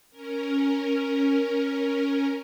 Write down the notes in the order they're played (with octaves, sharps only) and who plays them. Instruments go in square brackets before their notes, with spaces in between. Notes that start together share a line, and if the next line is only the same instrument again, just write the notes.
[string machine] C#4 A#4